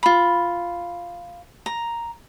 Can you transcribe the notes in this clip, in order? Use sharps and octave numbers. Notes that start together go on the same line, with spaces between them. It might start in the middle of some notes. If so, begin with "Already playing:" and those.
F4 B5
A#5